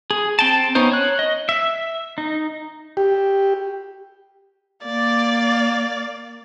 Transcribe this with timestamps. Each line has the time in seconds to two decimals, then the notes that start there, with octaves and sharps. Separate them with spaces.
0.11 G#4
0.39 C4 G5 A5
0.75 B3 C#4 D#4 C5
0.92 C#5 F#6
1.19 D#5
1.49 E5
2.18 D#4
2.97 G4
4.86 A#3 D5